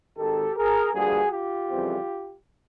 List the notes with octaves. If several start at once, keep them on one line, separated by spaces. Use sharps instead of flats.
G#1 G#2 D#3 G4 A4
G#4 A#4
G2 D3 F3 A#3 F#4 G#4
F4 G4
F2 C#3 E3 G3 C4